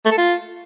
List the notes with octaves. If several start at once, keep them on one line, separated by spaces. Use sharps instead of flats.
A3
A4
F4